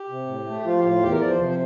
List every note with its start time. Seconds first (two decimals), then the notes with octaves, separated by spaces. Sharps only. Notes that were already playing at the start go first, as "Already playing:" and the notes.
Already playing: G4
0.09 C3
0.27 A2
0.46 A3
0.60 G4
0.65 F3 F4
0.79 G4
0.83 A2 F4
1.02 E2 G4
1.12 A#4
1.21 F3 D5
1.30 C5
1.39 C3
1.49 C5